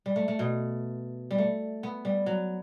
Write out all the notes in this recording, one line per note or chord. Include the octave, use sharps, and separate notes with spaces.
G3
A3
A3
B2
G3
A3
B3
G3
F#3